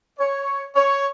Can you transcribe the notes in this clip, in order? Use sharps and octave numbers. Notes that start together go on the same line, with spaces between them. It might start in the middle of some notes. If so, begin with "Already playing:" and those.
C#5
C#5